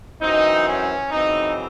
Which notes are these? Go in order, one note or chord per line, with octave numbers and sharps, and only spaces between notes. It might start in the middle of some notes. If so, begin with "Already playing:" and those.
F#2 E3 C4 D#4
C#4
F#2 C#3 E3 C4 D#4